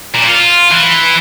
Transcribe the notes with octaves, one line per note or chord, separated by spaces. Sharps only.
A#2
F4
E3